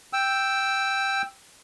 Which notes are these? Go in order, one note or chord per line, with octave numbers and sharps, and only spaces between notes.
G5 E6